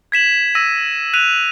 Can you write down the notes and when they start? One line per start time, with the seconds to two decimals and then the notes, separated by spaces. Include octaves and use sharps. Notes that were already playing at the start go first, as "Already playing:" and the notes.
0.12 G#6 B6 E7 F#7
0.55 E6 A#6 D#7
1.14 F#6 B6 D#7 F7